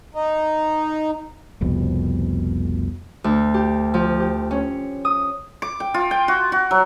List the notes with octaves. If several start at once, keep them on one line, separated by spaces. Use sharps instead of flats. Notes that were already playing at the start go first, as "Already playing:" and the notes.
D#4
F1 C2 F2 B2
D2
G4
F3
G4
C#4
D#6
D6
G5
F4
G5
F#4
F#4
F#3